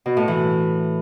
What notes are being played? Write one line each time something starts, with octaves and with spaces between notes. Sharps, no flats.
B2
A2
E3